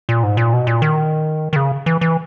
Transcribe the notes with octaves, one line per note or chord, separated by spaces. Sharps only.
A#2
G#2
A#2
B2
A#2
D#3
D#3
C#3
E3
E3